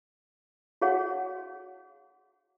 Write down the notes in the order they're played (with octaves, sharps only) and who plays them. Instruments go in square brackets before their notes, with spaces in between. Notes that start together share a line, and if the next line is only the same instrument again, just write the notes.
[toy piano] F#4 G#4 C#5 F5 F#5